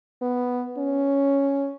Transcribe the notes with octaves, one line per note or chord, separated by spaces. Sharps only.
B3
C#4